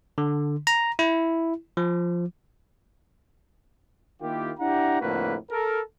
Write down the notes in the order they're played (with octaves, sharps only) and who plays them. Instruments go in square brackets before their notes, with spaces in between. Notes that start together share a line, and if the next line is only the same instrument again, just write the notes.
[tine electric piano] D3
A#5
E4
F3
[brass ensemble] D#3 A#3 E4 F4 G4
D4 E4 G4 F#5 A#5
F2 A2 D3 A#3 F#4 B4
A4 A#4